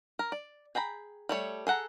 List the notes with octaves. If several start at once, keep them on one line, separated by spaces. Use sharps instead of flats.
A#4
D5
G#4 G5 A#5 B5
G3 A3 C#5
G#4 A4 F#5 A#5